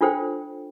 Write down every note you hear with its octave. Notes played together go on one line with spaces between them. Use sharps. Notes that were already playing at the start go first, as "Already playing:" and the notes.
D4 F4 A4 C5 G5